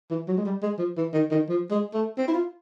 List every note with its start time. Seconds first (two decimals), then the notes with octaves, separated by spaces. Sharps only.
0.10 E3
0.28 F#3
0.37 G#3
0.45 G3
0.63 G#3
0.79 F3
0.97 E3
1.13 D#3
1.31 D#3
1.49 F3
1.71 G#3
1.94 A3
2.18 C4
2.28 E4
2.34 F4